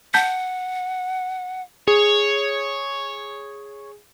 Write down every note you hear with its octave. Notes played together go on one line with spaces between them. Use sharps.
F#5 A5 G6 B6
G#4 C#5